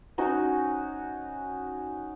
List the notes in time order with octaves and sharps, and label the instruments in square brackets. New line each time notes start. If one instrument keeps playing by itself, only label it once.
[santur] C#4 D#4 F#4